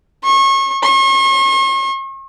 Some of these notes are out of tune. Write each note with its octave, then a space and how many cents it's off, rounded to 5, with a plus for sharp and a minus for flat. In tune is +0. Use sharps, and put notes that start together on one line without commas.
C#6 -30
C#6 -45